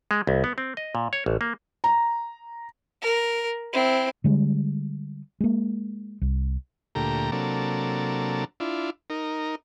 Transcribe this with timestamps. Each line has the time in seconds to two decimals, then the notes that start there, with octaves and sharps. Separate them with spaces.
0.11 G#3
0.27 C2
0.44 B3
0.58 C4
0.77 D#5
0.95 A#2
1.13 C#5
1.26 A1
1.41 A#3
1.84 A#5
3.02 A#4
3.73 C4 E4
4.24 D3 G3 G#3
5.40 G#3 A#3
6.21 C2
6.95 D2 A#2 A3 G4 A#5
7.32 C3 F#3 A#3 D4 A4
8.60 D4 E4 F4
9.10 D#4 A#4